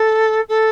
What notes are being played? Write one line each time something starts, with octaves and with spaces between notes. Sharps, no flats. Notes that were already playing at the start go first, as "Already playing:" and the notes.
Already playing: A4
A4